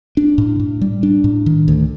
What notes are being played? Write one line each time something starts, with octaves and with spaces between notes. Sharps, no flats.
D4
A2
A2
G3
D4
A2
D#3
D2